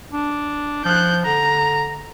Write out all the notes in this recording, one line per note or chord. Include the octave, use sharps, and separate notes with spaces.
D4
F3 F#6 G6
D3 A#5